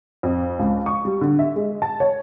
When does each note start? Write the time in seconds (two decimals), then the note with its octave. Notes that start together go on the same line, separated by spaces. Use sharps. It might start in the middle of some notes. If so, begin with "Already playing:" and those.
0.23 F2
0.59 C#2
0.86 C#6
1.05 G3
1.21 D3
1.39 E5
1.56 G#3
1.82 A5
2.00 C#5